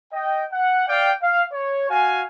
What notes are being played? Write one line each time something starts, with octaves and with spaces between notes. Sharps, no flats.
D#5 G5
F#5
D5 F5 G5
F5
C#5
F#4 F5 G#5